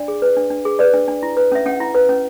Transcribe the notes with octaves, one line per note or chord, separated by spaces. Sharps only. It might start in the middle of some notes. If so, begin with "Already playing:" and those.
Already playing: D4 D5
G#4
B4
D4
D4
G#4
B4 D5
D4
D4
E4
B4
C#4 E5
C#4 F#5
E4
B4
C#4